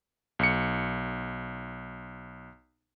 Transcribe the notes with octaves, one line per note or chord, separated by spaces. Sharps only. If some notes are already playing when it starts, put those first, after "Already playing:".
B1 C#7